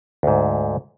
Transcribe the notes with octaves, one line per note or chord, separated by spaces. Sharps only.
D2 G#2